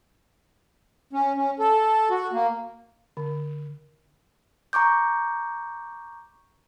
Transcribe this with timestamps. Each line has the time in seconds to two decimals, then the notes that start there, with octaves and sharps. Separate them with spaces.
1.13 C#4
1.37 C#4
1.59 A4
2.11 F#4
2.33 A#3
3.17 D3
4.73 A#5 C#6 D6 G6